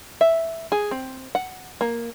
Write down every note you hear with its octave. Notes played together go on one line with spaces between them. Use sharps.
E5
G#4
C4
F#5
A#3